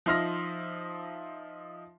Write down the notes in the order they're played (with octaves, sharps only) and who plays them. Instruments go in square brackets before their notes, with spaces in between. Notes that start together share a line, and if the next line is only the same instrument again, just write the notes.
[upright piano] F3 D#4 E5 C6 F6 A#6